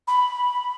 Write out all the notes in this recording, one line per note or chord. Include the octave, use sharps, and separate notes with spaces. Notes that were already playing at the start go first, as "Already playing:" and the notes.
B5